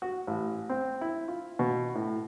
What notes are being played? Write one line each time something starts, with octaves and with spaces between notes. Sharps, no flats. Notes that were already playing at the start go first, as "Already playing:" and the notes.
F#4
A1
C4
E4
F4
B2
A2